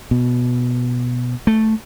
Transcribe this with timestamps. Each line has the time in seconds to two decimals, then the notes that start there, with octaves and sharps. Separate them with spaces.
0.11 B2
1.47 A3